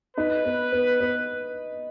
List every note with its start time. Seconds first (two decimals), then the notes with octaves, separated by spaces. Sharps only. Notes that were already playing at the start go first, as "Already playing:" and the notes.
0.17 D#4 B4
0.45 B3
0.73 B3
1.01 B3